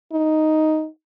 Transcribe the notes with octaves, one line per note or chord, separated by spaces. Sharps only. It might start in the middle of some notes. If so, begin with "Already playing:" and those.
D#4